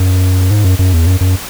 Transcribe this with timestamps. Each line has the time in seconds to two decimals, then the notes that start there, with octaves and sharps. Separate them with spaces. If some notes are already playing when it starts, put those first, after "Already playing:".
Already playing: F#2
0.51 G#2
0.65 F#2
0.79 F#2
0.93 E2
1.07 F#2
1.20 F#2